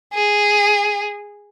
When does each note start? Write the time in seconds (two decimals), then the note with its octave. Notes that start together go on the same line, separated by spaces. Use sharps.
0.14 G#4